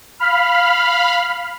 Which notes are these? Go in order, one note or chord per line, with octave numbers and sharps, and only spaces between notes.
F5 B5 F6